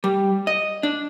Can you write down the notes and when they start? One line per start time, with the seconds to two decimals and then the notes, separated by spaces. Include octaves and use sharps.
0.04 G3
0.47 D#5
0.83 D4